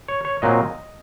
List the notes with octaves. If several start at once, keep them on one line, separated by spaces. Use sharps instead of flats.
C#5
C#5
A#2 F#3 C4 D#5